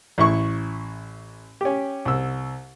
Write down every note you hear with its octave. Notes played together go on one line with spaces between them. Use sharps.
A1 E4 C#6
C#4 G4
C2 E6